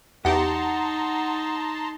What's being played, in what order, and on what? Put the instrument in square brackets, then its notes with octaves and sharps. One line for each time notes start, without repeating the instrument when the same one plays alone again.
[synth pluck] E2 G4 [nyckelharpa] D#4 [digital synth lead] F#5 [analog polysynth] A5 A#5 C6